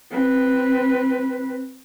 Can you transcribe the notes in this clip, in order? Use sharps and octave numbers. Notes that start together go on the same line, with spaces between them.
C4 B4